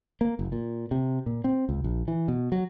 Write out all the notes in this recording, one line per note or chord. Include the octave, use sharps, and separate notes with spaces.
A#3
F#1
A#2
C3
A#2
C4
C#2
A#1
E3
B2
F#3